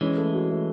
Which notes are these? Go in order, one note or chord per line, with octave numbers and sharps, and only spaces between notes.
E3 G#3 C#4
A3
F#4
A3